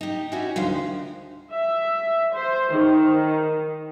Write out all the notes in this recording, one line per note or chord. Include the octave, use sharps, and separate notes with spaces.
D#4 G4
C#4 D#4 E4 F#4 G4
D2 D#3 F3 F5
E5
C5
D#3